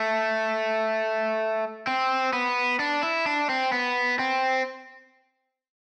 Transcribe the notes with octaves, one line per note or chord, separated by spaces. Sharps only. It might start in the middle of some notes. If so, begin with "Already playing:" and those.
Already playing: A3
C4
B3
D4
E4
D4
C4
B3
C4